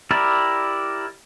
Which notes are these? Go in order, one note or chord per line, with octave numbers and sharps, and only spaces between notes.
E4 G4 A#4 D5